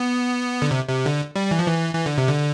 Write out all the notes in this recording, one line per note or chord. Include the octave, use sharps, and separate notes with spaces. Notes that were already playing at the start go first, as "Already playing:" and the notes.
Already playing: B3
D3
C3
C3
D3
G3
E3
F3
E3
E3
D3
C3
D3